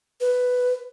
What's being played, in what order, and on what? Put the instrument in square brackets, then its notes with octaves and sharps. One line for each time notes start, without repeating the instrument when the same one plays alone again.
[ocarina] B4